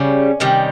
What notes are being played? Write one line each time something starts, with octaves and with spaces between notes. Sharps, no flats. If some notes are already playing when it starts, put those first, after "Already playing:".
Already playing: C#3 G3 C#4
C3 D#3 G3